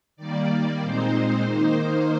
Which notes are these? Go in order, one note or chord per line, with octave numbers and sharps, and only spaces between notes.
D#3 G3 A#3 D5
A#2 G#3 C4 D#4 C5
D#3 A#3 D#4 C5